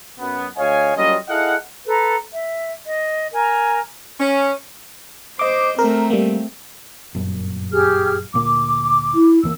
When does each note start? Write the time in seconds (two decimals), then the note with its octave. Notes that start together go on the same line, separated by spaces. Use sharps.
0.19 F#2 B3
0.57 D2 C#5 D#5 F5 G#5
0.96 F#3 G3 A#3 C#4 F4 D#5
1.29 E4 G#4 A4 D#5 F5 F#5
1.87 A4 B4 A#5
2.33 E5
2.85 D#5
3.33 A#4 G#5 A#5
4.20 C#4
5.39 C5 D#5 D6
5.79 A3 C4 A#4
6.10 G3 A#3
7.14 G1 F#2 A#2
7.73 G4 G#4 F6
8.34 D2 A#2 A#3 D6
9.15 E4
9.43 D#2 E3 A#3 E6